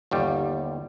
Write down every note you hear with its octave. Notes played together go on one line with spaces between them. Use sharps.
G1 D#2 G3